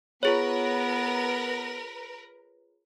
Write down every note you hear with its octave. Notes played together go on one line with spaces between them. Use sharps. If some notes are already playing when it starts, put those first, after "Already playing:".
B3 F4 G#4 A#4 B4 C#5